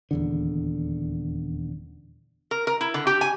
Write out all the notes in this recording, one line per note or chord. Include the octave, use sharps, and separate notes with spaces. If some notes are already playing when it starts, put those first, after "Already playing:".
D#1 E2 D3
A#4
A#4
E4
D3
G4
G#5